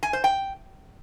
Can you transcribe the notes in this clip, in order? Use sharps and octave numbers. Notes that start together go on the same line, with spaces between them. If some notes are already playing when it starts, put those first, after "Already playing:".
G#5
C5
G5